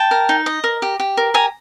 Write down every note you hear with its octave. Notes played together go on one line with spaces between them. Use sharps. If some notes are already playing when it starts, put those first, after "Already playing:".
Already playing: G5 A5
A#4
D#4
D#5
A#4
G4
G4
A#4
G4 G#5 A#5